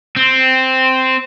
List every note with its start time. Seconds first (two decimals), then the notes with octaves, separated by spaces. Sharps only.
0.16 C4